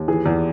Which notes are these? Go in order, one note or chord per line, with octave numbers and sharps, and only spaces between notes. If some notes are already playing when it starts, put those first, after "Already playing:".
Already playing: D#2
E3 G#4
E2